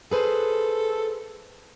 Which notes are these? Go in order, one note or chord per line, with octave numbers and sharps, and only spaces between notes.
G#4 A4 B4 C5